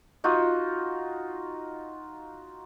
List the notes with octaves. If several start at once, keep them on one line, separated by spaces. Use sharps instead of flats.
D#4 F4 F#4